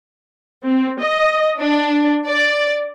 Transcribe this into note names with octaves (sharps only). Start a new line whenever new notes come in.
C4
D#5
D4
D5